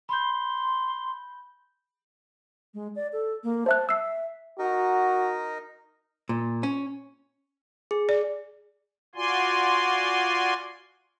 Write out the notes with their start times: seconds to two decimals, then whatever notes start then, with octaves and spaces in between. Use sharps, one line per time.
0.09 B5 C6 G6
2.74 G#3
2.96 D5
3.13 A4
3.44 A#3
3.66 C5 E5 A5 F#6
3.89 E5 E6 C7
4.59 D#4 F#4 A#4 D#5
6.29 A#2
6.63 C#4
7.91 G#4
8.09 D5
9.15 F4 F#4 D5 G#5 C6